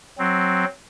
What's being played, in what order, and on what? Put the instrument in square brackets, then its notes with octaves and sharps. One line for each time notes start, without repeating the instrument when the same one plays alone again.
[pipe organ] F#3 C4